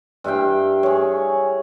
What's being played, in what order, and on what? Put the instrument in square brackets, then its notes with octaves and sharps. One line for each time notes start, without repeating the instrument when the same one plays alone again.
[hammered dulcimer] G2 E4 F5 G5
G#4 C#5